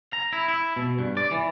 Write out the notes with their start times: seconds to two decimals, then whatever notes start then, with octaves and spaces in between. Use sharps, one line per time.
0.13 A#5
0.33 E4
0.48 E4
0.76 B2
0.99 G2
1.17 D5
1.31 E3